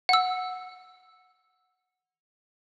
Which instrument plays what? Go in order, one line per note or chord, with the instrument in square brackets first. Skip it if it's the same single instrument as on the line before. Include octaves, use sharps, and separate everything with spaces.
[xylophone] F#5 E6